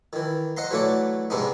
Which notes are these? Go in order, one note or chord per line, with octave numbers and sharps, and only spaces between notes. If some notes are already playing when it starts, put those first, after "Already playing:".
D#3 E3
C5 D#5 F#5 A#5 C6
E3 F#3 A3 C#5 D5 F#5
G#2 C3 G#3 B3 D4 D#4